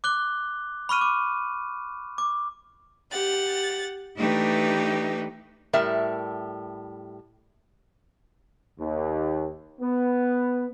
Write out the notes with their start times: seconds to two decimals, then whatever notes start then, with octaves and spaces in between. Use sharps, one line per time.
0.04 D6 F#6 G7
0.89 B5 C#6 F6 D#7
1.01 D6
2.18 D6
3.10 G4 F#5 A6
4.16 E3 A3 D4 D#4 G4 B4
5.73 A2 G3 A#4 E5
8.78 D#2
9.80 B3